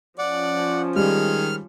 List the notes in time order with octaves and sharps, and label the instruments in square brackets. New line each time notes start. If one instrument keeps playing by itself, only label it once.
[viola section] F3 C#4 [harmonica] D5 [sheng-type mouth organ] F#5
[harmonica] D#3 G#3 [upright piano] G3 [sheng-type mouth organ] F6